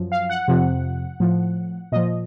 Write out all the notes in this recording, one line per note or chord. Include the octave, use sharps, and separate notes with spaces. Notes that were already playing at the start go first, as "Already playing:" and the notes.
Already playing: F#2 F3
F5
F#5
F2 C3 F3
A2 F3
A#2 F3 D#5